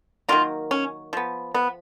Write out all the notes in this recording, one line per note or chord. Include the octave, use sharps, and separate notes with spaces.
D#3 F#3 A#3 F4
C#4
F3 B3
B3